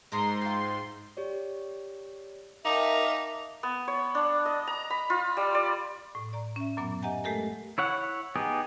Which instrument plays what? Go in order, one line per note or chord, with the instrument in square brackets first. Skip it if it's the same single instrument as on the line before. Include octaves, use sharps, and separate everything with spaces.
[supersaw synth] G#2 C6 [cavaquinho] A#4 D#5 A#5
[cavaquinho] F4 G5
[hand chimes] G4 C#5 D5
[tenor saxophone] D#4 [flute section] A#4 E5 [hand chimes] F5 G5 A5 [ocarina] D6
[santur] B3
C#5
D4
D#5
A#5
B5
F4
G3
D5
[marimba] A2
D5 A#5
C#4 E5
F#2 A#2 F#3 B3 D6
G4 D#5 E5 F#5 G#5 A#5
G#3 A3 G4 A4 A#4 G#5
[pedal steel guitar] E4 C#5 F#5
B3 D#4 G4 G#4